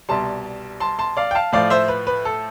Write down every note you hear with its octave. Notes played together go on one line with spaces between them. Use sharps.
C2 B2 G3 A5 C6
A5 C6
A5 C6
D5 F5
G5
F5 A5
A2 F3 D5 F5
C5 E5
B4
B4
A4